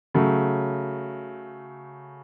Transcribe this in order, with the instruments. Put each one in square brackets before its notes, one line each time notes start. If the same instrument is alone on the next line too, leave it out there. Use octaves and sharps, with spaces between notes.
[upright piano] C#3 F#3 A3